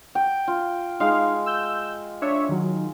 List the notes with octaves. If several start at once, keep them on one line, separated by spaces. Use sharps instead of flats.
G5
F4
G#3 D#4 F5
E6 G6
D4 C#5 E5
D#3 F#3